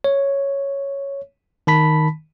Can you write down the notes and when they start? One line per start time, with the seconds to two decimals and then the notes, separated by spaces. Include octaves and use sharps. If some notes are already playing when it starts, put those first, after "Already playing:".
0.04 C#5
1.67 D#3 A5 B5 B6